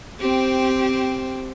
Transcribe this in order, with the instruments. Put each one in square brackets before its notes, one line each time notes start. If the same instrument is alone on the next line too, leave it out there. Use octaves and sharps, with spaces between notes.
[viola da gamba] C4 G4 C5